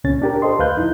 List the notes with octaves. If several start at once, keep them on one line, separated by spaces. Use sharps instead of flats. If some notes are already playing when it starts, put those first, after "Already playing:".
C#2 A#2 C#3 C#4 A6
D4 G4 A#4
A4 C5 D#5 C6
D2 B4 F5 F#6 G6
F2 D#4 E4 G6